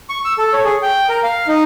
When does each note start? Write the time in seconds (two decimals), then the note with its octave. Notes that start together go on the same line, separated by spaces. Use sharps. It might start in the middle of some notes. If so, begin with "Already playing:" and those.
0.09 C#6
0.25 E6
0.38 A4
0.53 C#5
0.65 G#4
0.83 G5
1.09 A#4
1.23 F5
1.48 D#4